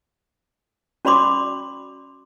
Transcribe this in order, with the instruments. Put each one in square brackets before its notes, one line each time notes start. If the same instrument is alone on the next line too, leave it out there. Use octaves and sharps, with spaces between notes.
[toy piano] C#4 F#4 D5 B5 C6 D6